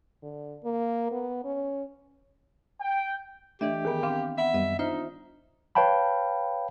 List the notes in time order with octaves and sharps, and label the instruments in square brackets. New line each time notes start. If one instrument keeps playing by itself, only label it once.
[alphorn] D3
A#3
B3
C#4
[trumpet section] G5
[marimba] E3 D#5 E5 [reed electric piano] A3 D4 [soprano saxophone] G4
[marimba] D#3 B3 [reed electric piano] G#4 A#4
[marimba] C4 D4 D6 [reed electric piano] F5
[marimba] B3 F#5 [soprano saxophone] E5
[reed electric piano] F#2 G3 B3 [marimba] D#5
[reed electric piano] D4 [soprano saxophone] D#4 [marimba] F4 C5 E5
[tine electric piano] B4 C#5 F5 G5 A5 B5